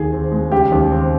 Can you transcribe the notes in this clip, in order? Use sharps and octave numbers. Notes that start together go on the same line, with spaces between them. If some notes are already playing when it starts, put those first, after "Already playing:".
Already playing: D#2 D#3 G#4
C4
G#3
C#3 G4
D#2
C4